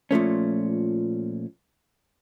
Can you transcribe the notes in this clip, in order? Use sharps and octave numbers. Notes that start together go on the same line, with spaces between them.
A#2 F3 A3 C#4